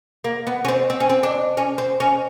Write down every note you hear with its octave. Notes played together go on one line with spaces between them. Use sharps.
A#3
B3
C#4
C4
C4
C#4
C4
D4
C#4
C4
C#4